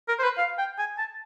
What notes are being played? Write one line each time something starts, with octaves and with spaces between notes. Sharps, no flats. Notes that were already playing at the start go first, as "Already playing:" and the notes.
A#4
C5
B4
F5
G5
G#5
A5